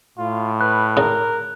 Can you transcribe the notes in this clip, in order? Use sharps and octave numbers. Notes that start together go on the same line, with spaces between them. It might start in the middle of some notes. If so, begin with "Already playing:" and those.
A2 F4
B4 F#6
C#3 D#4 A#4